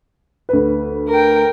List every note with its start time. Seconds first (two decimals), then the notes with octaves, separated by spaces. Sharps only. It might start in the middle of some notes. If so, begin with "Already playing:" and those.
0.49 D2 B4
1.08 A#4 G5